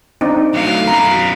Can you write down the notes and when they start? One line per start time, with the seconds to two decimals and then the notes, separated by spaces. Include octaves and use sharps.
0.21 C4 D4 D#4
0.54 A2 F#3 F5
0.88 F#2 B3 A#5